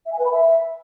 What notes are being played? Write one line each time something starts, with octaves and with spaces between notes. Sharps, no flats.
E5
G#5
B4
B5
E5